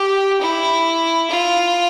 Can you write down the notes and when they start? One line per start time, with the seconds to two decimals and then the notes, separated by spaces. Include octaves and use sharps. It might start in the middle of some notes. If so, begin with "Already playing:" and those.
Already playing: G4
0.41 E4
1.30 F4